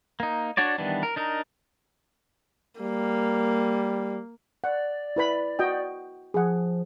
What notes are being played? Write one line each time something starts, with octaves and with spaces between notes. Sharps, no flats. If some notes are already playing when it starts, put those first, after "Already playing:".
A#3 D#4
D4 F#4 C#5 D5
D#3 E3 G3 B3 D4
A#4
D4 D#4 A#4
G3 A#3
D5 F#5
E4 B4 B5
F#4 D#5 G5
F3 G#4 F#5